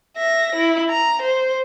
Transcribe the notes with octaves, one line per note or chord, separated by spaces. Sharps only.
E5 A#6
E4
A#5
C5